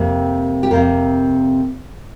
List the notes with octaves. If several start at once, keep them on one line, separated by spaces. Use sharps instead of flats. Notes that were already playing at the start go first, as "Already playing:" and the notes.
Already playing: F2 C3 A#3
G4
F2 C3 A#3 A#4